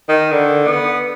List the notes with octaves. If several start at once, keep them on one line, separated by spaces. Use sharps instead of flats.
D#3
D3
B3